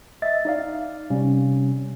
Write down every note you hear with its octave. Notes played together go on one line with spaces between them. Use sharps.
D#5 E5 A6
D#4 D5 F5
C3 G3 C#4